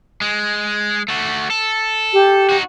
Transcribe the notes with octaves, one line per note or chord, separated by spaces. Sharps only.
G#3
A3 F#4
A4
G4
D#4 F#4